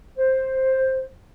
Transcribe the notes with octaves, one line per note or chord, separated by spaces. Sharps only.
C5